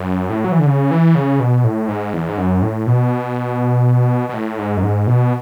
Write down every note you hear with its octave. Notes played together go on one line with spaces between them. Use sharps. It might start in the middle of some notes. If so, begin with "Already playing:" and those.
Already playing: F#2
A2
F#3
E3
D3
C#3
E3
C#3
B2
A2
G#2
E2
G#2
F#2
A2
B2
B2
A2
G#2
F#2
G#2
B2